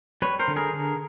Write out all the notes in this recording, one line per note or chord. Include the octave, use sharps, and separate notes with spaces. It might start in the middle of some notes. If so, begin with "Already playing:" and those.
G3 B4 C#5
A#4 C5
D3
G#4 A#4
D3